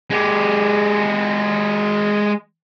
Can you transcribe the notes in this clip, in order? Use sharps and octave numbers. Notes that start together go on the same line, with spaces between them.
G#3 G4